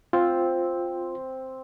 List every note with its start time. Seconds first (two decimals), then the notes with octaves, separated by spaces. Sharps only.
0.13 C4 F4